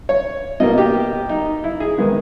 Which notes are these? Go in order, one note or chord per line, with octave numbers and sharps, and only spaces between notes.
C#5
B2 A#3 D#5
G4
D#4
E4
G#4
D#3 G#3 B3